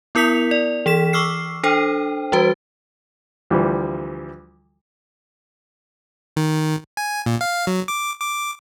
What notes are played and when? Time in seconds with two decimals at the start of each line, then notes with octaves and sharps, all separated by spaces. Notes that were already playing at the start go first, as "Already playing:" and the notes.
0.15 B3 E4 A#4 D#6 B6 F7
0.51 D5
0.86 E3 G#4 B6 E7
1.13 C#6 D6 E6 F6 C7
1.64 D4 A4 C5 G5
2.32 E3 G3 F#4 B4
3.50 D2 E3 F3 G3
6.37 D#3
6.97 G#5
7.26 A#2
7.41 F5
7.67 F#3
7.88 D6
8.21 D6